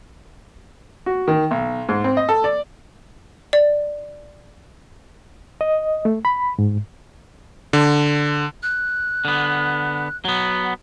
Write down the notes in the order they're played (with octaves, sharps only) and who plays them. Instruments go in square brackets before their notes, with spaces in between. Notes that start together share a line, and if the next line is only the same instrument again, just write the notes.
[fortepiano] F#4
D#3
B1
G#2
C4
D#5
A4
D5
[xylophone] D5
[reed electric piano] D#5
A3
B5
G#2
[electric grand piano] D3
[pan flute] F#6
[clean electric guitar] D3 B3
F#3 B3